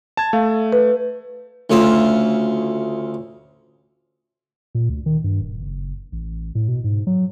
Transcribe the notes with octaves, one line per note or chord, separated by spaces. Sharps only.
A5 G#6
A3 F5
B4
D2 C#3 F4 E5
A#2
D2
D#3
G2
D#1
F#1
A1
A2
B2
G#2
F#3